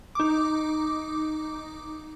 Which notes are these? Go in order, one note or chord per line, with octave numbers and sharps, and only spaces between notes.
D#4 D6